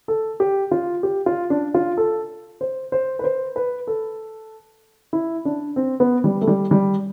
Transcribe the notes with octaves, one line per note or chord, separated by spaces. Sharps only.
A4
G4
F4
G4
F4
D4
F4
A4
C5
C5
B4
C5
B4
A4
E4
D4
C4
B3
G3
A3
G3
G3